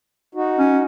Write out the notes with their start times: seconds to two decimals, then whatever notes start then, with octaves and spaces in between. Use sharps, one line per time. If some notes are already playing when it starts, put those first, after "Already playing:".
0.35 D#4 F#4
0.59 C#4